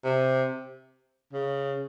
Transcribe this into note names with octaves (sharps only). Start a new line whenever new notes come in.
C3
C#3